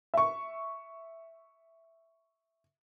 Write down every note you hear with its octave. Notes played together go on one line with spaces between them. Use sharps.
E5 C#6